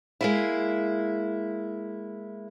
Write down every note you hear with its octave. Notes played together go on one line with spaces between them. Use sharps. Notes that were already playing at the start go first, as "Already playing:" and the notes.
G#3 A#3 E4